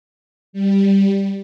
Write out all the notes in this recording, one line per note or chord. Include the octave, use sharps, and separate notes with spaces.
G3